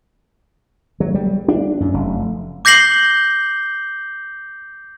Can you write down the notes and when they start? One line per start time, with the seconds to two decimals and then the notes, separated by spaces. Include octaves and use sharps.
1.00 F#3
1.15 G3
1.48 D4
1.80 F#2
1.94 F1
2.65 D6 G6 A#6 C7 F#7 G7